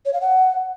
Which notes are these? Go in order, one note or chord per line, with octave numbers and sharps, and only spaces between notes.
C#5
F5
F#5